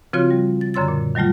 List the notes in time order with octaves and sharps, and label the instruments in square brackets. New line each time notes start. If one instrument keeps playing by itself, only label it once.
[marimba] C#3 F3 C4 F4 F#4 C#5
G3
A6
F#2 D3 C#5 C6 E6 A6
A#2
D#3 F#3 G3 A3 F4